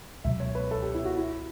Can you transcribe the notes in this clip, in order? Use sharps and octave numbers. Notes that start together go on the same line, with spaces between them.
C#2 B2 F#3 E5
C#5
B4
A4
G4
E4
F#4
E4